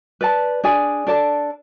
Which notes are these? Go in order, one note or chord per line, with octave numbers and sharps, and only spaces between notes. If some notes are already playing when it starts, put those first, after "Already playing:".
B4 D5 A5
D4 G#4 D5 G#5
D4 A4 D5 A5